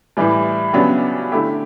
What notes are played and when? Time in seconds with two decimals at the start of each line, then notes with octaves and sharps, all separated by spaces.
0.17 A2 E3 G3
0.73 C#3 F#3 B3 D4 G4
1.32 D3 A3 E4 G4